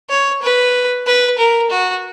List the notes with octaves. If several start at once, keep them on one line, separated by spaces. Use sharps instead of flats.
C#5
B4
B4
A#4
F#4